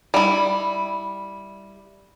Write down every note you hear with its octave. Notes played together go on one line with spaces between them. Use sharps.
G3 E4